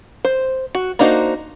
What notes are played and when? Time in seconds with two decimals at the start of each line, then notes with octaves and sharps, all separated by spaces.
0.25 C5
0.75 F#4
0.99 A#3 D4 D#4 F#4 C5